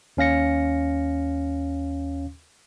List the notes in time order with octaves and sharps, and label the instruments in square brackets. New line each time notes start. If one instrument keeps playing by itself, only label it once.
[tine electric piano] D#2 C#4 F5 A#6 C#7